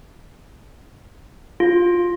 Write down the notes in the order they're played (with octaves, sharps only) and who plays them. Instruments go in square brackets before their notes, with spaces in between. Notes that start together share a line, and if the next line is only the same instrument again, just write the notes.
[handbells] F4